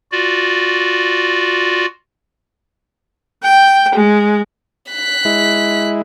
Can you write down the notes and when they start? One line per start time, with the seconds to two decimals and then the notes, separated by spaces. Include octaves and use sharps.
0.12 F4 F#4 D5
3.43 G5
3.95 G#3
4.91 F#6 B6
5.25 G#3 E4